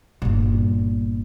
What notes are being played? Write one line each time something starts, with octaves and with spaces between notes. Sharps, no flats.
G1 A#2